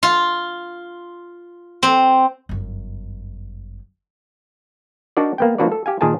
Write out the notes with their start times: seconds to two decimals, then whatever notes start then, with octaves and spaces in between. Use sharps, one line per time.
0.03 F4
1.83 C4
2.49 G1 F#2
5.17 D4 D#4 F#4 A#4 D5
5.38 A#3 B3 G5
5.58 F3 A#3 D4 F#4 B4 D5
5.72 A4
5.86 G4 F5 G#5
6.01 A#2 D#3 G#4 A#4 G#5 A5